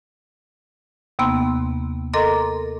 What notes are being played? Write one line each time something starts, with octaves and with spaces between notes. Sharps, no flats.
D#2 C3 A#3 B3 C6
A4 A#4 D#5 A#5 C6 D6